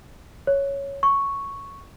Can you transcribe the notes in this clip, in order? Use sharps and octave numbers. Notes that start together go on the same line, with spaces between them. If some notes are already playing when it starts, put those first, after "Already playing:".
C#5
C#6